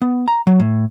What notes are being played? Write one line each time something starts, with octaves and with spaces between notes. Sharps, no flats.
B3
A#5
F#3
A2